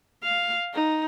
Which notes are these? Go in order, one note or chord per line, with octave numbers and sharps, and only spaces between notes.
F5
D#4